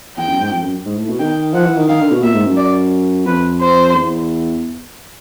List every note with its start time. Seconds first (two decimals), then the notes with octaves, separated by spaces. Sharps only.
0.17 E2 G5
0.28 F#2
0.40 G#2
0.51 F2
0.63 F#2
0.85 G#2
0.97 A2
1.09 B2
1.19 D#3 G5
1.54 F3 F#5
1.66 E3
1.77 D#3
1.88 D#3 F5
2.00 D3
2.12 B2
2.23 A#2 E5
2.34 G#2
2.45 F#2
2.57 D5
3.26 F2 B4
3.61 C5
3.95 E2